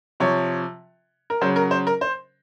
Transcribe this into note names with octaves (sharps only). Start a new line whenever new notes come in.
C3 F3 C#5
A#4
C#3 F#3 C5
A#4
C5
A#4
C5